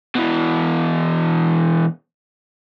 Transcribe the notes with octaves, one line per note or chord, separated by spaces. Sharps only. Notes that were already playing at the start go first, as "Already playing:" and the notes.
B2 E3